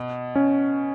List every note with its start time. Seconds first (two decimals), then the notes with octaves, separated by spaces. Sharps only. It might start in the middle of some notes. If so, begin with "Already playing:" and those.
Already playing: B2
0.36 C#4